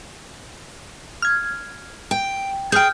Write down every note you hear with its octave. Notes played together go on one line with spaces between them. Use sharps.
F6 G#6
G5
G#4 G5 F6 G6